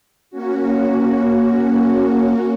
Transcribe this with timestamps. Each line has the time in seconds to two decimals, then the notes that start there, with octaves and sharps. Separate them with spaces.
0.30 A#3 C#4 F#4